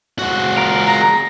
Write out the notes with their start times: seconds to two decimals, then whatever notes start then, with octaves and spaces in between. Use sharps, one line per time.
0.19 G#3 F#4
0.56 F4 A#4 F5
0.87 A#5